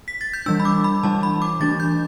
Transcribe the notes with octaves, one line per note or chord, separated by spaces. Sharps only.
B6
A6
G6
E3 G3 D4 E6
B5
D6
B5
E3 G3 D4 A5
B5
D6
E3 A3 D4 A6
G6